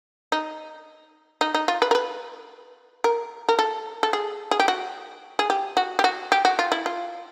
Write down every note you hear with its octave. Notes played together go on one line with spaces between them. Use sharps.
D#4
D#4
D#4
F4
B4
A#4
B4
A#4
A#4
A4
A4
G#4
G#4
G4
F#4
G#4
G4
F#4
G4
F#4
G4
F#4
F4
E4
F4